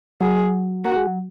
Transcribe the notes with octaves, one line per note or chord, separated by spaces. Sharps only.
F#3 G#4
A#3 F#4
G#3
F#3